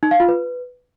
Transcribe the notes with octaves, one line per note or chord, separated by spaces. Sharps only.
D#4
F5
F4
B4